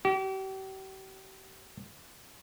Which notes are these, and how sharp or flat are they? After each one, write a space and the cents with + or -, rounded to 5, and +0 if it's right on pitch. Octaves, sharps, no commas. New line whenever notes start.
G4 -40